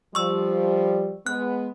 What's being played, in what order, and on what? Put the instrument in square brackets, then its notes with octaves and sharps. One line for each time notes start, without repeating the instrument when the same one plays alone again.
[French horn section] F3 G3 [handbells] C#6 E6
[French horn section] G#3 B3 [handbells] F#6